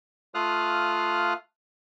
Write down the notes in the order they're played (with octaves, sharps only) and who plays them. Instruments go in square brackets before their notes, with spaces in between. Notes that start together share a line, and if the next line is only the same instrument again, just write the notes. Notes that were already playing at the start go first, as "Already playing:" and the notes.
[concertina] A3 F4 F5 D#6 F6 F#6